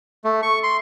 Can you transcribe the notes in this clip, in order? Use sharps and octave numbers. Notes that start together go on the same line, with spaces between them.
A3
C#6
C6